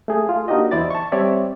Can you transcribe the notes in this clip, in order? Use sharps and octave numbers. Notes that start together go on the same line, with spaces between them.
A3 G#4
F4
A#3 D4 D#4 F#4 G4 D#5
E2 E4 C5 D5 A6
A5 C#6
G3 C4 C#5 D5 E5